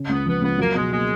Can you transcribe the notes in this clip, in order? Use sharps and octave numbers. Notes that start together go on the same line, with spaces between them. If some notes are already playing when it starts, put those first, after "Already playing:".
Already playing: C#3
C#2 B3
F3 B3
C#2 B3
F#3 A#3
B2 G#3
G#3 A#3